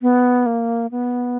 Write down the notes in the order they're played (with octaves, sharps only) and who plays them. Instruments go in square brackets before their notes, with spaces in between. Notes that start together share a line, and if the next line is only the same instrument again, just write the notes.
[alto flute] B3
A#3
B3